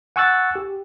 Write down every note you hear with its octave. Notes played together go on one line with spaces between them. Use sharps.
F#5 G#5 C#6 E6 F#6 A6
G4